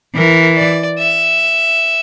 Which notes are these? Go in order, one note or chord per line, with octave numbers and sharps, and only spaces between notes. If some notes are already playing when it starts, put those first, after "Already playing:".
E3 A#4
D5
E5